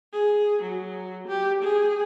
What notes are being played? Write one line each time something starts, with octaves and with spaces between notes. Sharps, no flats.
G#4
F#3
G4
G#4